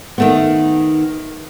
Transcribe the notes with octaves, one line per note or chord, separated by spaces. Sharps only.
D#3 A3 B3